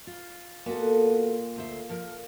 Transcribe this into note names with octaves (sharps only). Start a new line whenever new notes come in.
F4
A#2 B3 F#4 A4
D2 C5 E5
F3 A#4